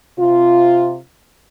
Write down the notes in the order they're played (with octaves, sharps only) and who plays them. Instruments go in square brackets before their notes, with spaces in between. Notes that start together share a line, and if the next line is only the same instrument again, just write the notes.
[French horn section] C3 F4